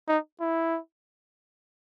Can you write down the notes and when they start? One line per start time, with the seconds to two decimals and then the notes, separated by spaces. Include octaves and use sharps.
0.08 D#4
0.41 E4